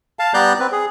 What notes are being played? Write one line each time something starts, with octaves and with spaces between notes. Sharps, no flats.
F5 A5
G3 B3 D5 A#5 F#6 G6
C4 B4
G#4